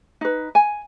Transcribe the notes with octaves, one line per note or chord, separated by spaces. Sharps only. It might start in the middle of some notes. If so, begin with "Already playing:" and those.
D#4 B4
G#5